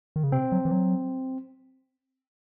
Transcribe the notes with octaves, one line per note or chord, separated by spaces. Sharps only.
D#3
C#3
C3 C4
F#3
E3
F#3